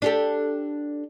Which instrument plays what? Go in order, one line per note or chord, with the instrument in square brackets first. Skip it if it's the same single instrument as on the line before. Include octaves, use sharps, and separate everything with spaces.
[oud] D4 G4 A4